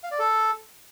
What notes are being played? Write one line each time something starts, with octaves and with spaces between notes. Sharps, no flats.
F5
D5
A4